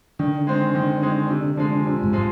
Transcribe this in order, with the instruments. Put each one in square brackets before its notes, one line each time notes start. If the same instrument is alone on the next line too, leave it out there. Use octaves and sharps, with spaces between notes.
[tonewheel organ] D3 [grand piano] D#3
[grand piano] G#3 C4 D#4
D#3
G#3 C4 D#4
C3
F3 G#3
C3
[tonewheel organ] G#2
[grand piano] F3 G#3